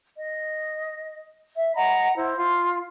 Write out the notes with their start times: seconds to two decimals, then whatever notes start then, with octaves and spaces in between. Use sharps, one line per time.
0.17 D#5
1.56 E5
1.75 D#5 F#5 A#5 B5
2.16 E4 C5
2.36 F4